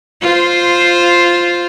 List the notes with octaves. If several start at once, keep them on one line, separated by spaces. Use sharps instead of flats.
F4 C5